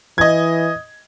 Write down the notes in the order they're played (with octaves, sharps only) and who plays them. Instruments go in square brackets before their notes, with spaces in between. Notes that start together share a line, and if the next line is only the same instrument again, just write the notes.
[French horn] E3 [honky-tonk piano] D#5 G#6